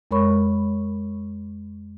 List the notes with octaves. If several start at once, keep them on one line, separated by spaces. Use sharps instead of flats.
F2 G#3 A#4 C#5 B5 C#6